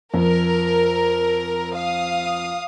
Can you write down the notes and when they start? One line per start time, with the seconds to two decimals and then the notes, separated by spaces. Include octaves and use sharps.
0.14 F2 A#4
1.73 F5 D#6